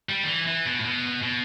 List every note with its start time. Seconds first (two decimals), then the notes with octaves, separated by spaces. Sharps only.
0.09 G3
0.24 D#3
0.28 E3
0.47 E3
0.66 B2
0.79 A2
0.84 B2
1.22 B2